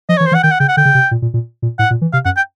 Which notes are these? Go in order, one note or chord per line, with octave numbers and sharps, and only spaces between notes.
F3 D#5
C#5
E3
C5
E3
F#5
D#3 G5
F#5
C#3 G5
F#5
D3 G5
C#3
C3
A#2
A#2
A#2
A#2
A2 F#5
A#2
E3
C3 F5
F#2 F#5
G5